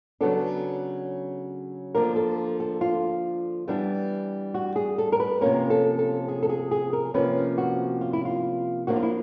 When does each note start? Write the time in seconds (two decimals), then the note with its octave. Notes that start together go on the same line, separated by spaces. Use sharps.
0.21 C#3 F#3 B3 D4 A4
1.95 D3 F3 A#3 D4 A#4
2.16 A4
2.60 A4
2.81 F4
3.68 E3 G3 B3 D4
4.54 F#4
4.76 G#4
4.98 A4
5.12 A#4
5.20 B4
5.41 C3 F3 A#3 C#4 A#4
5.70 A4
5.99 A4
6.28 G#4
6.43 A4
6.49 G#4
6.71 G#4
6.93 A#4
7.14 C3 F3 A#3 C#4 B4
7.58 F#4
8.01 F4
8.13 E4
8.25 F4
8.87 F3 A#3 D4 F#4
8.96 F4
9.03 E4